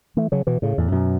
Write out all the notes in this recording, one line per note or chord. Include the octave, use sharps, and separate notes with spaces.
E3 A3
C#3 F#3
B2 E3
A2 C#3
E2 A2
F#2 B2